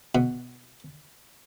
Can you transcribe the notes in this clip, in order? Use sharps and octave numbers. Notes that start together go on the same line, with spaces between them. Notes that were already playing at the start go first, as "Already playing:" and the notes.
B2